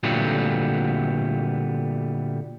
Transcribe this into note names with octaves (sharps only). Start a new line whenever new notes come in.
A#2 D3 F#3 G3 A3 B3